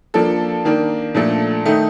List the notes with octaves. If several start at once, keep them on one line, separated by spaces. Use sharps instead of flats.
F3 A#3 D4 A4
D#3 A#3 D4
A#2 F3 A3 D4 A4
D#3 A3 D#4